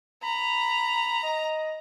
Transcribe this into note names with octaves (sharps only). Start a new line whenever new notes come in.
A#5 B5
D#5